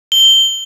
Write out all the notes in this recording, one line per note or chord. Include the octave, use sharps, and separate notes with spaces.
G7